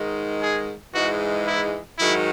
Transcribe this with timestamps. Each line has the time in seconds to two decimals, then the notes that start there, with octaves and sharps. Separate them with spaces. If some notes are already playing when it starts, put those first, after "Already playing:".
Already playing: G#2 D#3 G#3
0.42 G#4
0.93 G#2 E3 G#3 F#4
1.46 E4
1.98 G#2 D#3 F#3 E4